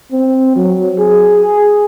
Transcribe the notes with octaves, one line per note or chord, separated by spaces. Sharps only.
C4
F#3
G#4